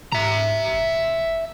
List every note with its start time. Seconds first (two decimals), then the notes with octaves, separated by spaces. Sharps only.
0.12 G#2 E5 A#5
0.74 F1